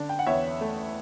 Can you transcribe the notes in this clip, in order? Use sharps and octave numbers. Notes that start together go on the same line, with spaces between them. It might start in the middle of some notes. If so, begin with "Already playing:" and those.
Already playing: D3 D4
G5
F#5
E2 C#5 E5
A3